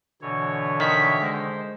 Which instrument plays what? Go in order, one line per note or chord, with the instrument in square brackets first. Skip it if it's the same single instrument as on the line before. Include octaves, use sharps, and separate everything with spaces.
[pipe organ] B2 E3 C#5 [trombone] D3
[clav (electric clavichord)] D#3 [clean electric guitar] E5
[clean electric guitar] G#3 [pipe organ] C5